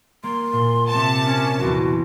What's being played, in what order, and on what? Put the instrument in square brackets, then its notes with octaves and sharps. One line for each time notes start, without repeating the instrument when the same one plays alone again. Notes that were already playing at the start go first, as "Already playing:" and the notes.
[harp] A#3 [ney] C6
[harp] A#2
[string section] C3 A5
[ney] C#4
[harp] B1 E2 [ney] F#4